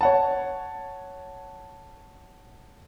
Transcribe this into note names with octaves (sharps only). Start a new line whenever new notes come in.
C#5 F#5 A5